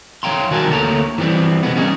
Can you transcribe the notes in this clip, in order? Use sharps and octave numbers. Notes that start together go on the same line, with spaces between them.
F3 C#5 F5 G5 A#5 C6
D#3 G3 F#4 A#4 G#5 A5
D2 A#3 A4 C#5 A#5
E3 F3 G3 C4
C3 G#3 B3
G3 A3 C#4 D#4 G#4